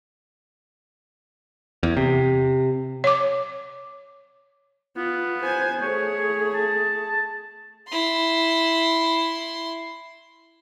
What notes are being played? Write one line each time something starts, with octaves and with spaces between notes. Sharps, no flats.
E2
C3
C#5 D6
B3 F4
C5 G#5
A3 G#4 C#5
A5
E4 C6